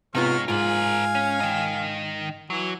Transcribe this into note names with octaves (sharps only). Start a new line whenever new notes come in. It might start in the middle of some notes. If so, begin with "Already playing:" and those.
C3 G#3 B3 D#4 F4 C#5 F6
G#2 F4 A#4 C5 F5 G#5
C#4
D#3 D#5
E3 F#3